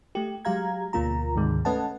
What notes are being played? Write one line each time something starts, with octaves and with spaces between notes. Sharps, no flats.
A3 G4
F#3 G#3 G4 F5 A#5 G#6
D2 B2 A#3 F4 A#5
D2 G#2 C3 D#3 G#3
A3 C#4 B4 D#5 F#5 A5